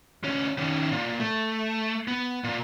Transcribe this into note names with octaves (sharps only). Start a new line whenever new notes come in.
D2 C#4
D#3 C#4
A#2
A3
B3
A#2